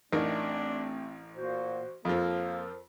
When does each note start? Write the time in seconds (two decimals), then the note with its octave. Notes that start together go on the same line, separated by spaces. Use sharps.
0.13 A1 A3 C4 D4 D#4 A#4
1.36 A#2 F#4 C5
2.05 F2 F3 A#3 A4 A#4 C5